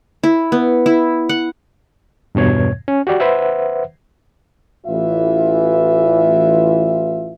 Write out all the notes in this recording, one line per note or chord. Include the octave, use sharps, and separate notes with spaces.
E4
B3
E4
F#5
E2 G2 B2 C#5 G#6
C#4
F#4 G4 D5
B4 C5 E5 F#5
A1 E3 F4 E5